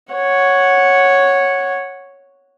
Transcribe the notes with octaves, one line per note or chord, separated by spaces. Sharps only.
C#5 F#5